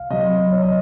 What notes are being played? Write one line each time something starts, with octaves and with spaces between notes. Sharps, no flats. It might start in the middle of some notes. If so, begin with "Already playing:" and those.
Already playing: C2 F5
C3 F#3 D#5
C2 C#5
D#5